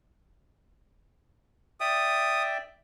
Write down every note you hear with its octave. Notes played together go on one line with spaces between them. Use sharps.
D5 E5 G5 D#6